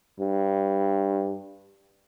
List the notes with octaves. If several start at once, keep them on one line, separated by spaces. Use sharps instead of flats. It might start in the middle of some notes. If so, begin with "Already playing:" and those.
G2